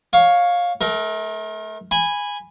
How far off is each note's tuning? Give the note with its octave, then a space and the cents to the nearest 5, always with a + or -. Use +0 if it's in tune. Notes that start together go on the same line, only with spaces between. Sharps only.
C#5 +0 F5 +15
A3 -35 A#4 +10
G#5 -10 B5 +0